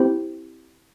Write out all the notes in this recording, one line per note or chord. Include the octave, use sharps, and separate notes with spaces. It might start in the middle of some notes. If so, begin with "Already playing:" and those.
Already playing: C4 E4 G4 C5